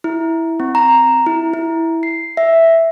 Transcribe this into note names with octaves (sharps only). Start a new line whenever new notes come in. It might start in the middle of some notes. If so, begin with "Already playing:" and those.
E4
C4
A#5
E4
E4
C7
E5